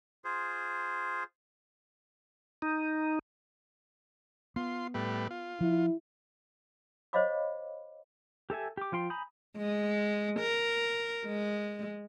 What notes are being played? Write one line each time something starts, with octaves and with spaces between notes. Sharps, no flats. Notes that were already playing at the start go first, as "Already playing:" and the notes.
F4 G#4 C5
D#4
B3 F4 C6
A2 G3 B4
F4
F3 E4
C5 C#5 D#5 F5 B5 D6
G4 A4 E5 G#5
G4 D6
F3 F4 G5 C6
G#5 A#5 B5 D#6 G6
G#3
A#4
G#3